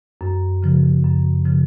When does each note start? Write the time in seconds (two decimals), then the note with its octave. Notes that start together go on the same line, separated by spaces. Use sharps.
0.21 F#2
0.63 C#3 F3
1.04 F#2
1.45 C#3 F3